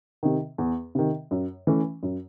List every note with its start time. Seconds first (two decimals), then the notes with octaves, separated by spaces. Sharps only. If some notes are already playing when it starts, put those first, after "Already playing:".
0.23 C3 D#3
0.58 E2
0.95 C3 D#3
1.31 F#2
1.67 E3 A3 C#4
2.03 F#2